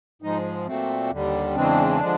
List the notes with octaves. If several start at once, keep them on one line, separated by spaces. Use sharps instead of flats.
G#2 F3 G#3 D#4
A#2 F#3 A3 C4
D#2 D3 G3
E2 C#3 E3 G#3 C4 D4
D3 F3 G#3